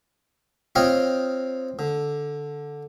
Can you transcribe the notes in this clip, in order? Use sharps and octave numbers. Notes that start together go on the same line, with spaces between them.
C4 F4 C#5 D#5 F5 G5
D3